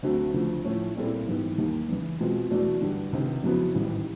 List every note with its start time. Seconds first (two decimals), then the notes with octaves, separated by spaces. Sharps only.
0.03 D2 D3 F#3 A3 C4
0.34 D2 C#3 F3 A3
0.64 A2 F3 A3 C#4
0.96 A#2 G3 C4 E4 A4
1.27 G#1 G#2 E3 G3 B3
1.58 D#2 D#3 G3 A#3
1.88 E2 C#3 E3
2.20 B2 G#3 C4 F4 G#4
2.50 E2 B2 F#3 A3 D4
2.81 G2 D3 G3
3.13 C#2 C3 D#3
3.43 F2 C#3 F#3 B3 E4
3.74 A1 G#2 D#3 G3